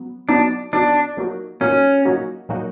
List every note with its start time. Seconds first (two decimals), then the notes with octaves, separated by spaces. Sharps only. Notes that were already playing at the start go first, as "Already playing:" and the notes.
Already playing: F#3 B3
0.29 B2 F#3 B3 D4 D#4
0.73 B2 F#3 B3 D4 D#4
1.17 A#2 F#3 A#3 D#4 F#4
1.61 A#2 F#3 A#3 C#4 D#4 F#4
2.05 A#2 F#3 A#3 D#4 F#4
2.49 A#2 F#3 A#3 D#4 F#4